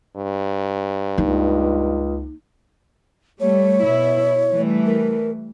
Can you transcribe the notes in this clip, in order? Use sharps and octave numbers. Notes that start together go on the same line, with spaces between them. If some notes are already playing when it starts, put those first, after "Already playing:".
G2
C#2 A#3 D#4
G3 A3 C#5
B2 E4
E3 G3 A3
A#4